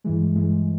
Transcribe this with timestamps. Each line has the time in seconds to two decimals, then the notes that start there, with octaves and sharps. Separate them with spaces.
0.04 G2 E3 G#3
0.36 G2 E3 G#3